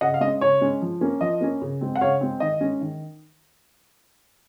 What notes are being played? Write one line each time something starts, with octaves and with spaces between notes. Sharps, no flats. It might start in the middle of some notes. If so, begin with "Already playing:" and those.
C#3 D#5 F#5
F5
G#3 C#4 D#5
C#3 C#5
G#3 C#4
F3
A#3 C#4
F3 D#5
A#3 C#4
C#3
G#3 C4
F#5
C#3 C#5 F5
G#3 C4
D#3 D#5
G#3 C#4
D#3